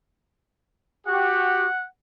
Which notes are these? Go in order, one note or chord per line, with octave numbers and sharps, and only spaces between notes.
F#4 G4 F#5